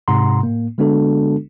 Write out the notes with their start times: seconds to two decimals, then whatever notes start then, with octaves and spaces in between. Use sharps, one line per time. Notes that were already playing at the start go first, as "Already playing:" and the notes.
0.08 G#2 C3 F#5 A#5 C6
0.43 A2 A#3
0.78 D3 G#3 B3 D4 F#4 A4